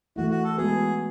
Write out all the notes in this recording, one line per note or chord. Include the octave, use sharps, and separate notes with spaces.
E3 A3 E4 F#4
F#4
A4
G#3 B3 F#4 G#4 B4